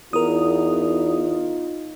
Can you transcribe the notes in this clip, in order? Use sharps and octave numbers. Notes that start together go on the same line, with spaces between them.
E2 D#4 F4 A#4 D#6